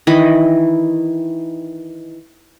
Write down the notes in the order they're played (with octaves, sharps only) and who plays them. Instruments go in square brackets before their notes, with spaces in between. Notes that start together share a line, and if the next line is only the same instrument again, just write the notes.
[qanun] D#3 E3 D#5 B5